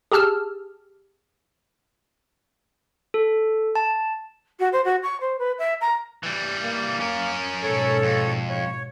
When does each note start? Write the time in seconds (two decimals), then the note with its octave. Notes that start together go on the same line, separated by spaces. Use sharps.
0.12 G4 G#4 A5 E6 F6
3.14 A4
3.75 A5
4.60 F#4
4.73 C5
4.85 F#4
5.03 C#6
5.21 C5
5.39 B4
5.59 E5
5.81 A#5
6.23 E3 G3
6.63 A#3
7.00 C#4 A#4
7.63 G#2 B2 A4 C#5
8.02 F2
8.50 C#5